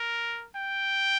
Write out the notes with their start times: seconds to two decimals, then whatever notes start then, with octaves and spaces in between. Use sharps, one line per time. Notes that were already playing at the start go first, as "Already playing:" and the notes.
Already playing: A#4
0.56 G5